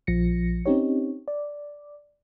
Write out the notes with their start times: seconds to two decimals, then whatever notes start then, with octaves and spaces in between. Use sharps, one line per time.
0.07 A#1 F3 A#6 C#7
0.66 C4 C#4 D#4 G4 C#5
1.28 D5